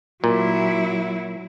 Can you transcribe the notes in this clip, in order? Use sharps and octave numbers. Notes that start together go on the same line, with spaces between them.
A#2 F#3 E4